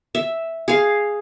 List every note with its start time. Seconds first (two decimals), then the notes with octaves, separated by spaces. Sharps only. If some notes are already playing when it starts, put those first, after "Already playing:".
0.15 E5
0.68 G#4 F5